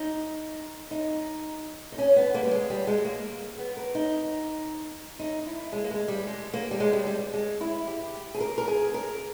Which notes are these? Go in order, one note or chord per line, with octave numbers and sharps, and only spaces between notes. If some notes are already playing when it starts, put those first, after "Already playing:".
Already playing: D#4
D#4
D#4
C#4
B3
A#3
G3
G#3
G3
G#3
G#3
A#3
B3
A#4
D#4
D#4
E4
G#3
A#3
G#3
G3
G#3
A#3
G3
G#3
G3
G3
G#3
E4
G4
G#4
A#4
A#4
G#4
A#4